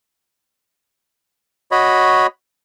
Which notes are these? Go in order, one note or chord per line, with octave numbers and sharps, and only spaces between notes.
F#4 C#5 D#5 B5